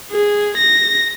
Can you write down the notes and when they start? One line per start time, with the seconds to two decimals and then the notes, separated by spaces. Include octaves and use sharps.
0.12 G#4
0.57 A#6